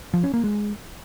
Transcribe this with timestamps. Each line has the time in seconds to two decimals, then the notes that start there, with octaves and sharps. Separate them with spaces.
0.14 F3
0.24 C#4
0.34 A#3
0.44 G#3